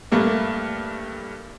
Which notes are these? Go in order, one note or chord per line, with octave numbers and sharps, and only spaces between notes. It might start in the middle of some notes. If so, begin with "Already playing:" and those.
G2 A3 A#3